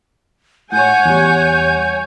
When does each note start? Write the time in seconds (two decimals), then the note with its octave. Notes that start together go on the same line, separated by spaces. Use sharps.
0.72 A2 C#5 F#5 G#5 G6
1.05 E2 G3